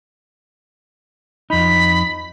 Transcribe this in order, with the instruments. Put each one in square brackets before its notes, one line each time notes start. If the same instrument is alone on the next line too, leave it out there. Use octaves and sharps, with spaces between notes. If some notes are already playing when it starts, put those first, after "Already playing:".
[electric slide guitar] F2 D#4 [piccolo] B5